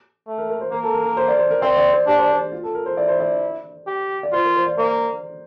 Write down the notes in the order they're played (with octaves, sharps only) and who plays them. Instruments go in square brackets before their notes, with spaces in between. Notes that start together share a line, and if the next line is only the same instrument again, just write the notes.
[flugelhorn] A3
[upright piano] A#4
A#4
C5
[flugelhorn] A#3 [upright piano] A#4
[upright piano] A4
A#4
A#4
C5
D5
C5
A#4
[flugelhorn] C4 [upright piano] D5
[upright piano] D5
C5
[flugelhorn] D4 [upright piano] G4
[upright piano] C5
C5
F4
A4
A#4
C5
[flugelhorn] E4 [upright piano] D5
[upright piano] C5
D5
[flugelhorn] G4
[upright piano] D5
[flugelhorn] F4 [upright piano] C5
[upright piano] A#4
C5
D5
[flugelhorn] A#3 [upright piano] C5